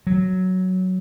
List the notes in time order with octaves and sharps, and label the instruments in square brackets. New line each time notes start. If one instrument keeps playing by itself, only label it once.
[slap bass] F#3